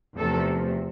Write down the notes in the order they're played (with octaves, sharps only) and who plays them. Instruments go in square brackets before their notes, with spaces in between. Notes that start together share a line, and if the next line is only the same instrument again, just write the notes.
[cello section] E2 C3 F3 A3 A4